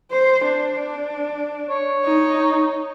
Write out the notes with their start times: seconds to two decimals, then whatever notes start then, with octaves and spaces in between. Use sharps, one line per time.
0.12 C5
0.46 D4
1.70 C#5
2.05 D#4